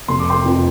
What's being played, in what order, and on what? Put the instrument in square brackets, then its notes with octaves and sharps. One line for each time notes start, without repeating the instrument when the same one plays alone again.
[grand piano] F1 C6
D6
G5 C6
F2 F3